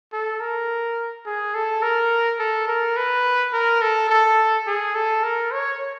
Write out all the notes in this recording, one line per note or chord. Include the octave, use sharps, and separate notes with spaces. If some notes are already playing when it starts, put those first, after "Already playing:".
A4
A#4
G#4
A4
A#4
A4
A#4
B4
A#4
A4
A4
G#4
A4
A#4
C#5